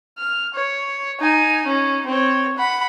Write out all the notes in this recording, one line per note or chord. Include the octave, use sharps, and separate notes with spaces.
F6
C#5
D#4 G#5
C#4 D#4
C4 C#5
F#5 B5